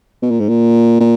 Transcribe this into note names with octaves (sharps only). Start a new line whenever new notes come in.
B2
A#2
G#2
A#2
A#2